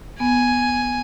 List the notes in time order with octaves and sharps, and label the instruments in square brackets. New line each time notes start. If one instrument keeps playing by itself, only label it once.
[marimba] B3 [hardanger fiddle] G#5